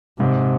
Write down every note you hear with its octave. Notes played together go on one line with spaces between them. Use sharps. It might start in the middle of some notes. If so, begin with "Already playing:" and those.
G#2 C3